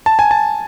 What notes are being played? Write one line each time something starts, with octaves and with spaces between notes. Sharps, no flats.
A5
G#5
A5